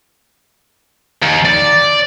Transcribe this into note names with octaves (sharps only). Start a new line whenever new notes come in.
D#2
D5